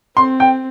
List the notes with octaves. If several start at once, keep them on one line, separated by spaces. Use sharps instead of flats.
C4 C6
G5